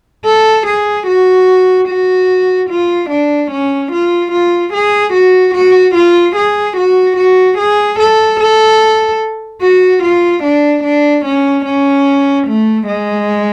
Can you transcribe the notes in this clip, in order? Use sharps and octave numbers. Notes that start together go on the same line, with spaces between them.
A4
G#4
F#4
F#4
F4
D4
C#4
F4
F4
G#4
F#4
F#4
F4
G#4
F#4
F#4
G#4
A4
A4
F#4
F4
D4
D4
C#4
C#4
A3
G#3